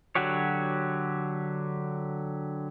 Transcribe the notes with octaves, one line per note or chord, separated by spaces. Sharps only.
D3 F#3 F#4 G4 C#5